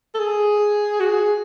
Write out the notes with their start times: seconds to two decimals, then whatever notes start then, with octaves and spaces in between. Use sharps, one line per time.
0.15 A4
0.20 G#4
1.00 F#4
1.07 G#4